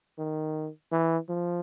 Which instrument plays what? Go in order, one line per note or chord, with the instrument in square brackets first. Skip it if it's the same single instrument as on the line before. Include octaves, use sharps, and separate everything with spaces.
[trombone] D#3
E3
F3